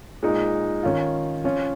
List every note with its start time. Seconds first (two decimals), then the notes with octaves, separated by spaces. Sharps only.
0.22 A#2 G#3 D#4
0.83 D#3 C#4 F4
1.44 F3 C#4 F4